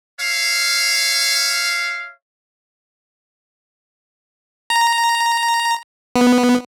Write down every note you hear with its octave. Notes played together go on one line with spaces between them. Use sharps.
C#5 E5 F5
A#5
B3